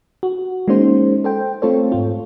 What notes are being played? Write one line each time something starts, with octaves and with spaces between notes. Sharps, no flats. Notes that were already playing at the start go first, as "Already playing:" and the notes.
F#4
G#3 A#3 C#4 D#4 C5
A4 C5 G5
A3 C4 F4 A4 C5 C#5
G#2 F4